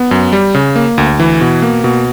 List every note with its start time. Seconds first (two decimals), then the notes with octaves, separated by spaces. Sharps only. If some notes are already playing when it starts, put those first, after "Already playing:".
Already playing: B3
0.11 F#2
0.33 G3
0.55 C#3
0.76 A#3
0.98 D2
1.20 E3
1.41 B2
1.62 A#3
1.84 B2